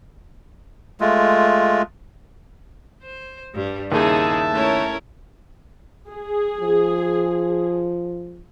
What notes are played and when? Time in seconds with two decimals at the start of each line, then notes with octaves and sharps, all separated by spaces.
1.00 G#3 A3 F4
3.03 C5
3.54 G2 G3
3.92 D#2 C#3 D#4 E4 G#4 E5 A5
4.53 A3 C#4 E4 A#4 C#5
6.10 G#4
6.61 F3